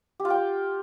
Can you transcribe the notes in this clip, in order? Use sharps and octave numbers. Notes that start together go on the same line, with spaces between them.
G4
F4
G5